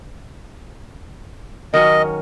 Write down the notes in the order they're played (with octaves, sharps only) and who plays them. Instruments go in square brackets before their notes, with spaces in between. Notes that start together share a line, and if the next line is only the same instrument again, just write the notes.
[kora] D#3 F#3 C#4 [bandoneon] D#5